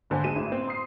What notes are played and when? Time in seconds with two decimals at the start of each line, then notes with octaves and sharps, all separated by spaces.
0.10 G#1 D3 C5 G#5
0.24 B1 G#3 D#7 E7
0.36 A1
0.52 C4
0.68 C6 D#6 C7